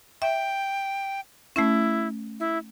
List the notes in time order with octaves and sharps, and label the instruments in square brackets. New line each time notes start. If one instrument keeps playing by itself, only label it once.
[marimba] E5 [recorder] G5
[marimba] A3 C#4 [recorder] E4
[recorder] E4